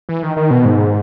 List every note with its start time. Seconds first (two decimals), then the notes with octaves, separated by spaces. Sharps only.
0.09 E3
0.23 D#3
0.37 D#3
0.51 B2
0.65 G#2